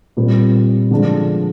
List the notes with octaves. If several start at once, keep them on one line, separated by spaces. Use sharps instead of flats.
A#2 G3 C4 G4
D3 F3 G#3 D4